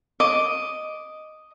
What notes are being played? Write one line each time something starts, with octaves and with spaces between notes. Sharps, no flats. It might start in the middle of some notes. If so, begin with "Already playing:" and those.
D#5 D6